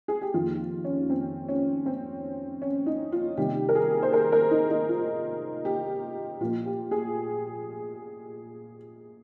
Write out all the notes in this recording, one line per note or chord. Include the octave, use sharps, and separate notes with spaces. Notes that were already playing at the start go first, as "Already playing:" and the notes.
G#4
G4
F2 D#3 A#3 F4
C#4
C4
C#4
C4
C#4
D#4
F4
C3 D#3 G3 A#3 G4
A#4
G#4
C5
A#4
A#4
D#4
D#4
F4
G4
A#2 F3 A#3 F4
G4
G#4